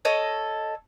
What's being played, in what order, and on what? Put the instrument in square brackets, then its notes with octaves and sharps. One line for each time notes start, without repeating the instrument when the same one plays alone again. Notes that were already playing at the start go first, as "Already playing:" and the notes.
[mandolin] A4 C#5 D#5